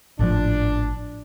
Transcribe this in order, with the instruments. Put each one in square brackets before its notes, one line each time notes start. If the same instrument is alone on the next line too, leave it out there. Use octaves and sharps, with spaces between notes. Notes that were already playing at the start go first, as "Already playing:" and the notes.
[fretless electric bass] G#1 A2 F3 [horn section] D4